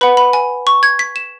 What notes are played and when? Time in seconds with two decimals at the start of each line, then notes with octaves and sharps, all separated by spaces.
0.01 B4 F#5 B5
0.17 B5
0.33 G#5
0.67 C#6
0.83 G#6
0.99 B6
1.16 E7